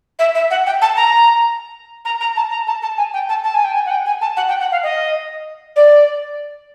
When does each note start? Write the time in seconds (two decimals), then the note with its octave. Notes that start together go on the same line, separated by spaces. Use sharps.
0.19 E5
0.35 E5
0.51 F#5
0.66 G5
0.82 A5
0.97 A#5
2.05 A#5
2.21 A#5
2.36 A5
2.51 A#5
2.67 A5
2.82 A5
2.97 G#5
3.14 G5
3.29 A5
3.44 A5
3.54 G#5
3.65 G5
3.74 G#5
3.86 F#5
3.91 G5
4.06 G#5
4.21 A5
4.37 F#5
4.49 G5
4.60 F#5
4.72 F5
4.83 D#5
5.76 D5